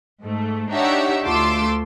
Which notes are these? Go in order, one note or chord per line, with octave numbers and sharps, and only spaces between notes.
G#2 A3
D4 D#4 G4 C#5 E5 F#5
D2 A3 F4 C6 D6 E6